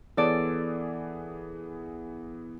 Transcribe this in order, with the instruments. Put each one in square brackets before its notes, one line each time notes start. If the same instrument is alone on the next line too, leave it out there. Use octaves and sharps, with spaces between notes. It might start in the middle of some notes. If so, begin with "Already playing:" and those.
[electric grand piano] E3 B3 G#4 [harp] A4 D5